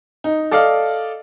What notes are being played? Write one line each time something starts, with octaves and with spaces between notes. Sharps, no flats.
D#4
A4 D5 D#5 F5